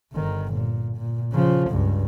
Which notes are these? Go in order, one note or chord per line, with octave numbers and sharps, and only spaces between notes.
G1 D#3
A#2
A#2
C#3 F3
C#2 G2